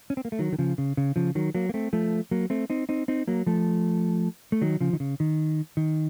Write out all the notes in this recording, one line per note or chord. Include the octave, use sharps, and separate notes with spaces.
C#4
C4
A#3
A3
D#3 F#3
D#3
C#3 F3
C#3
C#3
C#3 F3
D#3 F#3
F#3 A#3
A#3
A3 C4
F3 A3
F#3 A#3
A3 C4
C4 D#4
C4 D#4
C4 D#4
F#3 A#3
F3 A3
A3
D#3 F#3
C#3 F3
D#3
C#3
D#3
D#3